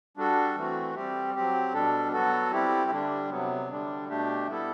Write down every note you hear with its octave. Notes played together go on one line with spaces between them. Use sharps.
G3 D4 F#4 A4
E3 A3 C4 F#4
G3 C4 G4
F#3 C4 G4
B2 G3 D4 A4
F#3 B3 F#4 A4
G3 C4 E4 G4
D3 G3 D4
C3 F#3 B3
D3 G3 D4
B2 A3 D4 G4
G3 B3 E4 A4